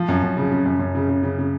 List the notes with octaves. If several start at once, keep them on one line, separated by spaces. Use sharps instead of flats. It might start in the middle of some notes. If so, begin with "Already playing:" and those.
Already playing: F3
F#2
F#2
C#3
C#3
F#2
F#2
C#3
C#3
C#3
C#3